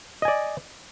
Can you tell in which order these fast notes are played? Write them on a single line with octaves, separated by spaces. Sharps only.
D#5 G#5 D5